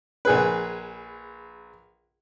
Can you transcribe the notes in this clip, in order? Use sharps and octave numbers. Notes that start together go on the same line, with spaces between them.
A#1 G#4 B4